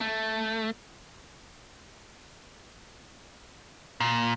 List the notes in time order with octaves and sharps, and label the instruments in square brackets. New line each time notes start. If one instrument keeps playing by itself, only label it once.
[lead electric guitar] A3
A#2